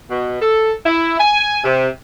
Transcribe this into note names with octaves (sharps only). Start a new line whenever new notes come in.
B2
A4
E4
G#5
C3